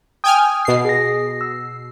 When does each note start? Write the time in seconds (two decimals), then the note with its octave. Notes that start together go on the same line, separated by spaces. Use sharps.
0.24 G5 G#5 D#6 F6
0.65 B2 C7
0.85 G#4 A#6
1.41 E6